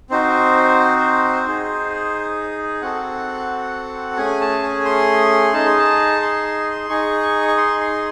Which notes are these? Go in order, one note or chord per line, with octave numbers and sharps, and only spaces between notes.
C4 D#4 F#4 C5
D#4 G#4
C4 F#4 A4 F#5
A3 C#4 G#4 G#5
A5
G#5
C6
D#4 G#4 A5
C6
A5
C6
D#4 G#4 C#6
C#6
C6
C6